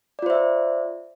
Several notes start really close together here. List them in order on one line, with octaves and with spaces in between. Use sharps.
D5 F4 C5 E5